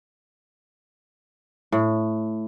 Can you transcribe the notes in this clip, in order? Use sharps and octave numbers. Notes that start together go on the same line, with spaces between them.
A2